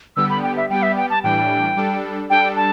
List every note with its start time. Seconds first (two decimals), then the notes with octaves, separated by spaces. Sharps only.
0.16 D3 G3 B3 G4 E6
0.30 B5
0.43 G5
0.57 E5
0.70 G3 B3 G4 G5
0.83 E5
0.97 G5
1.10 A5
1.23 A2 E3 G3 D4 G5
1.76 G3 D4 A4
2.30 G3 D4 A4 G5
2.56 A5